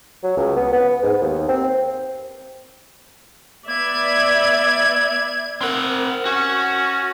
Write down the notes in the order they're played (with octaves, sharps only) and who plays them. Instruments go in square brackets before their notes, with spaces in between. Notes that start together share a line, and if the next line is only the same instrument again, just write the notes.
[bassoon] F#3
C#2
B3
B3
G#2
D#2
C4
[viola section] B3 D5 E5 [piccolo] G#6
[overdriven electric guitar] C4 F#5 [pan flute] A#4
[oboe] C#4 [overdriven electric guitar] F#4